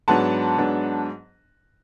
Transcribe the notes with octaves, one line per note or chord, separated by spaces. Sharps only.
G#2 F#3 B3 D4 F#5 A5
G#2 F#3 B3 D4